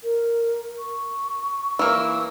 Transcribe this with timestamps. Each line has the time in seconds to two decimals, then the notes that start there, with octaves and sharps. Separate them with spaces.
0.04 A#4
0.78 C#6
1.79 E3 A#3 E6